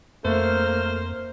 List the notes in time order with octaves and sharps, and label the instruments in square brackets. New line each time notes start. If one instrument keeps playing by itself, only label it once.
[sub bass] F2 [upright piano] A3 [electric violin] A#3 F6 [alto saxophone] C5